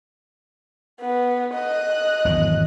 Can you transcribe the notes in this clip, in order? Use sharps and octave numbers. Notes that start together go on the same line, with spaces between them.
B3
D#5 F#6
G#1 E2 F#3